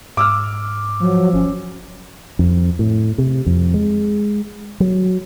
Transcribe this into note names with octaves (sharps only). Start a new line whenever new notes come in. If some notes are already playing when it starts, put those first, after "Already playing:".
G#2 D6 E6 F6
F3 F#3
G1 C#4
F2
A2
C3
F2
G#3
F#3